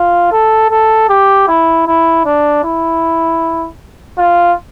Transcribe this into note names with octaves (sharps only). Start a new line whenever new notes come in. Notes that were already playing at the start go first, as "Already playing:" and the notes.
Already playing: F4
A4
A4
G4
E4
E4
D4
E4
F4